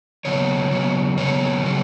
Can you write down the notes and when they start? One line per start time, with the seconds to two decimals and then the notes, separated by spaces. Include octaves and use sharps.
0.25 C#3 F#3 B3 C#5
0.71 C#3 F#3 B3
1.18 C#3 F#3 B3 C#5
1.64 C#3 F#3 B3